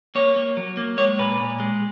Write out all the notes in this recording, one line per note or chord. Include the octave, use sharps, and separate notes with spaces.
A#3 C#5
A#3
F#3
A#3
G#3 C#5
A#2 B4
A#2
G#3